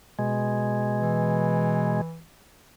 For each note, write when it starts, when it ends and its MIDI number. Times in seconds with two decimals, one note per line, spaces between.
0.19 2.01 47
0.19 2.01 56
1.01 2.23 52